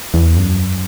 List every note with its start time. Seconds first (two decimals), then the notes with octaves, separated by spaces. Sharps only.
0.14 E2
0.37 F#2